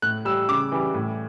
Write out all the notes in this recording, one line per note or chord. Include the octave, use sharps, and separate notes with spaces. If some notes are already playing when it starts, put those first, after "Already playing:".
A2 F#6
G3 E6
C#3 D6
E3 G3
A2